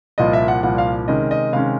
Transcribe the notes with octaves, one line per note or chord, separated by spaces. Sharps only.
C2 A#2 F3 D#5
E5
F#5
C2 A#2 F3 F#5
F5
C3 D#3 G#3 C#4 D#5
D#5
C3 D#3 G#3 C#4 F5